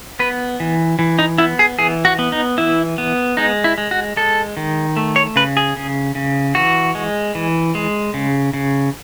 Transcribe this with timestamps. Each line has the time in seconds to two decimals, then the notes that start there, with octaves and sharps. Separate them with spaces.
0.19 B3 B4
0.60 E3
0.99 E3
1.19 D#4
1.38 B3 E4
1.59 G#4
1.79 E3 G#4
2.05 F#4
2.19 B3
2.32 D#4
2.58 E3 E4
2.98 B3
3.37 G#3 D#4
3.64 E4
3.78 G#3
3.91 F#4
4.17 G#3 A4
4.57 D#3
4.97 A3
5.16 C#5
5.36 C#3 B4
5.57 G#4
5.77 C#3
6.15 C#3
6.55 E3 F#4
6.95 G#3
7.35 E3
7.75 G#3
8.14 C#3
8.54 C#3